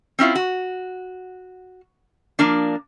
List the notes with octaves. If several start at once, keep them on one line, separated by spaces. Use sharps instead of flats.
C4 C#4 E4 F4
F#4
F3 A#3 D4